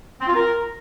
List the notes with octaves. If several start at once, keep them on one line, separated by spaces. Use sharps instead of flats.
C4
F4
A#4